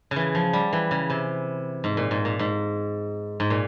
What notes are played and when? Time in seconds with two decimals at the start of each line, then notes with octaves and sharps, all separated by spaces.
0.11 C#3
0.16 E3
0.35 F3
0.53 G3
0.73 E3
0.91 C#3
1.10 C3
1.84 G#2
1.97 A#2
2.11 G#2
2.25 A#2
2.39 G#2
3.40 G#2
3.50 A#2